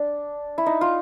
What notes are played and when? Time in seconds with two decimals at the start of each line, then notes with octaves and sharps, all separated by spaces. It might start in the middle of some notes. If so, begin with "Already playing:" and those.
Already playing: D4
0.58 E4
0.66 D#4
0.81 F4